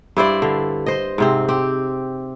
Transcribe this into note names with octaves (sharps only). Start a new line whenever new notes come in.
G2 E4 C5 D5
D3
C5 D#5
G#2 C3 C4
C4 G4